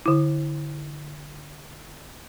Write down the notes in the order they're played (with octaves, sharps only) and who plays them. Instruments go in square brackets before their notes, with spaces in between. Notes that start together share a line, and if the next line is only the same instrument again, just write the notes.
[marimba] D3 E4